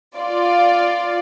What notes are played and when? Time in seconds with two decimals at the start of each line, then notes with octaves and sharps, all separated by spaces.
0.19 F4 D5